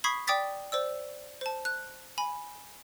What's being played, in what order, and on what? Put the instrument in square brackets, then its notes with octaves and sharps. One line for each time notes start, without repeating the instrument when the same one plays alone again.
[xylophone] B5 C#6 D#6 G#6 B6 C7
D5 G5 D6 D#6 A6 B6
C5 D5 E6
C5 A5
F#6
G#5 B5